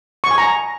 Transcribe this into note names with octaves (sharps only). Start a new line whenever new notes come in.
C#6
G#5
A#5